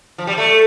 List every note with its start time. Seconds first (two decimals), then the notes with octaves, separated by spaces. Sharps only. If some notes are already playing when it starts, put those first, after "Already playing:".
0.18 F3
0.27 G3
0.38 A3